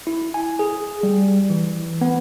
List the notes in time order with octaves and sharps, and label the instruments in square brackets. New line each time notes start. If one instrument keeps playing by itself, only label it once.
[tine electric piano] E4
G#5
G#4
G3
E3
B3